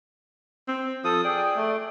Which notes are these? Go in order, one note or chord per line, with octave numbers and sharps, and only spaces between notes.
C4
F3 A4 D#6
G#4 D5 G5
A3